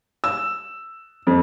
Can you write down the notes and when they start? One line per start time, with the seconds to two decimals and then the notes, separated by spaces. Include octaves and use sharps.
0.24 E6
1.27 F2